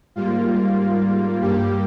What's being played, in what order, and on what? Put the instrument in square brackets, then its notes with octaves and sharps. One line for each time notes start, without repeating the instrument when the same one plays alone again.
[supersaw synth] G#2 G3 A#3 F4
G2 G3 A#3 G4